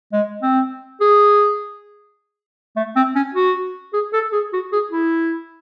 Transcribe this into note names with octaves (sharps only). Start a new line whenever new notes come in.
G#3
C4
G#4
A3
C4
C#4
F#4
G#4
A4
G#4
F#4
G#4
E4